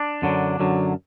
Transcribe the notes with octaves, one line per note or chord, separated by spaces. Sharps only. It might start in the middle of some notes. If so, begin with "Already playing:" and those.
Already playing: D4
F#2 D3 F#3
F#2 D3 F#3